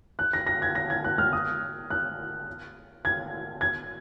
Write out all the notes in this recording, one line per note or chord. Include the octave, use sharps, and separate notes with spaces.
F#6
A#6
A#6
G#6
A#6
G#6
F#6
F6
D#6
F#6
G#6
G#6